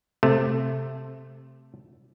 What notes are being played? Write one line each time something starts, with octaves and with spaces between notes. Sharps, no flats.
C3 A3